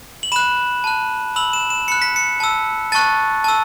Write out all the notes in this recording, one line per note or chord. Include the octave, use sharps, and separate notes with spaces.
F#7
B5 F#6 E7
A5 F#6
B5 E6 F#7
E7
E7
B5 F#6 C#7
B6
C#7
A5 E6
A5 C#6 F#6 A6
A5 E6